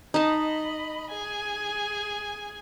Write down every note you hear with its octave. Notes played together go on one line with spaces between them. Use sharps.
D#4 D#5 A5 B5
G#4 G#5